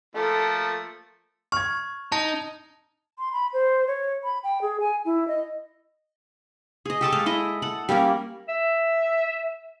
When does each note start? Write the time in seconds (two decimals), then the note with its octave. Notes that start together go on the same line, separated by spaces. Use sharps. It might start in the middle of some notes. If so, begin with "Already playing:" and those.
0.15 F3 A3 A#3 A4
1.52 C#6 F6 G#6
2.12 D#4 A5
3.19 C6
3.33 B5
3.53 C5
3.87 C#5
4.24 B5
4.44 G5
4.62 G#4
4.80 G#5
5.05 E4
5.28 D#5
6.86 G#4 D#5
7.01 G4 A4 A5 C#6
7.12 G#3 A4 F5
7.26 E4 D#5
7.62 A4 F#5
7.89 G3 A#3 C#4 A#4
8.49 E5